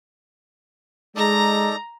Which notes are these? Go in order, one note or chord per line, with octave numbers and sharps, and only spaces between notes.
G#3 D#4 A4 D5 A#5 A#6